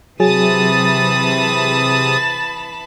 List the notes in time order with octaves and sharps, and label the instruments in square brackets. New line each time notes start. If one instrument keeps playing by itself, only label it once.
[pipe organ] C3 D#6 [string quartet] E3 A5 B5 [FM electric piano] F#3 G#4 [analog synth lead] A6